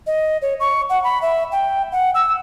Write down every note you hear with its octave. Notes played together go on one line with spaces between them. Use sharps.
D#5
C#5
C#6
F#5
B5
E5
G5
F#5
E6